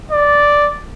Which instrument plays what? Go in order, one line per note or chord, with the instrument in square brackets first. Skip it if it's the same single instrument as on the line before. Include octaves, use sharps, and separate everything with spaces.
[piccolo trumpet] D5